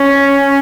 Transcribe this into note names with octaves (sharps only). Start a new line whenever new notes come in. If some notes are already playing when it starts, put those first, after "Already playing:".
Already playing: C#4